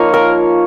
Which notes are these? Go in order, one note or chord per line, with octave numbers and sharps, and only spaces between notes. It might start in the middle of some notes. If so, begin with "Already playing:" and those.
Already playing: F3 A#3 D#4 C#5 F5
A#4